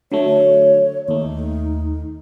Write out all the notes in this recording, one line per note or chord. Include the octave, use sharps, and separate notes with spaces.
D3 F#3 A3 C#5
D#2 A3 D#4